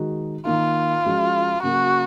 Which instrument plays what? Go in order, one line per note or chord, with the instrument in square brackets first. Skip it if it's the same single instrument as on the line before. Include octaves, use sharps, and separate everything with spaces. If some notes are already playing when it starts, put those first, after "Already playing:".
Already playing: [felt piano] D#3 G#3 D#4 F#4
[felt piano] D#3 A#3 D#4 [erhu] F4
[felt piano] F3 G#3 C#4 F#4
[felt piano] C#3 F#3 A#3 [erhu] F#4